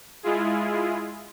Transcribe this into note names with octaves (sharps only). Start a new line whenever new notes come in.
G#3 E4 F4 G#4